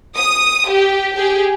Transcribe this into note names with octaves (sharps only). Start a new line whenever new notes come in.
D#6
G4
G4 G#4